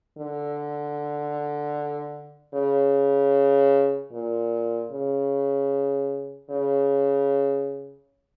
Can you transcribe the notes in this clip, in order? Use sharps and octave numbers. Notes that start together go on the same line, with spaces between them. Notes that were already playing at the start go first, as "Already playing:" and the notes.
D3
C#3
A#2
C#3
C#3